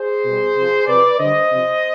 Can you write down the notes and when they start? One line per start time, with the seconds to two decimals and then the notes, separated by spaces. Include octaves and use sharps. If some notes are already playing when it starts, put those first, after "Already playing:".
Already playing: G#4 C5
0.25 B2 G3
0.55 C3 F3
0.87 C3 F3 B4 D5
1.18 D3 G3 C5 D#5
1.50 C3 F3